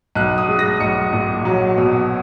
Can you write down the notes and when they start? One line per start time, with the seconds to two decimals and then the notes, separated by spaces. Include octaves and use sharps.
0.15 B1 F#6
0.38 D#6
0.49 G#3
0.59 A#6
0.80 B1 C#7
1.13 A#2
1.45 F#3
1.77 B2